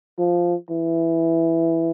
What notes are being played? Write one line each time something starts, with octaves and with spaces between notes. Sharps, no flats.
F3
E3